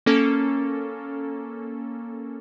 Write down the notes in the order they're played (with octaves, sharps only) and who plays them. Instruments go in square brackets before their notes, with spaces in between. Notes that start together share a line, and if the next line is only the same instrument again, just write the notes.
[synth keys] A#3 C#4 A4 A#4